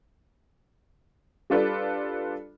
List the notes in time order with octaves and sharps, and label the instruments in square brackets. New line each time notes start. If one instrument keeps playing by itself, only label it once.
[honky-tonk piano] G3 D4 F4 A4 B4 D5